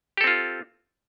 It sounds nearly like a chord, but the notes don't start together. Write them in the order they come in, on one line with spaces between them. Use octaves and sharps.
G4 A4 C4 F4